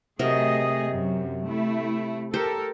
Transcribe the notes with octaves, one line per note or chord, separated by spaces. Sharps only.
C3 F#3 A3 G#4 A#4 D#5
F#2
A3 E4
G4 A4 A#4 C5 G5